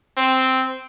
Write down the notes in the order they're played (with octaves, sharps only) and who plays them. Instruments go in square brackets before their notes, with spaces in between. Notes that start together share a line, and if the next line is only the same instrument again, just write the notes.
[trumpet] C4